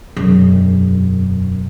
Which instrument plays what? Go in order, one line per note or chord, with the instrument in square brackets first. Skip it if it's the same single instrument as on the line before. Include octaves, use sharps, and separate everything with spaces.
[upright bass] E1 F#2